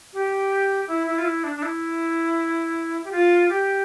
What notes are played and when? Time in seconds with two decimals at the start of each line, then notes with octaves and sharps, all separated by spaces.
0.13 G4
0.88 E4
1.07 E4
1.18 F4
1.25 E4
1.44 D4
1.56 D4
1.63 E4
3.04 G4
3.12 F4
3.49 G4